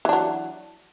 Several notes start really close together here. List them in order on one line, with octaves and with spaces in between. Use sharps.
E3 D4 F#3